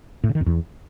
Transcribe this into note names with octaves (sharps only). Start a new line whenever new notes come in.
A2
C#3
D#3
F2
E2